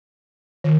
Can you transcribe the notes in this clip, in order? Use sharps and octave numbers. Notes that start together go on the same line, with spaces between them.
D#3